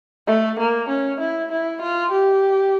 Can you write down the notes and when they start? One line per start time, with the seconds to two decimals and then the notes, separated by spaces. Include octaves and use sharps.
0.27 A3
0.59 A#3
0.89 C#4
1.20 E4
1.51 E4
1.82 F4
2.12 G4